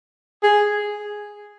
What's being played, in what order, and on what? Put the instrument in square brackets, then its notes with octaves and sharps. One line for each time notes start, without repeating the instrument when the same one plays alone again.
[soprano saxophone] G#4